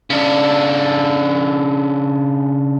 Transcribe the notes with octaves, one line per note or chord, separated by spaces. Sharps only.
C#3 D4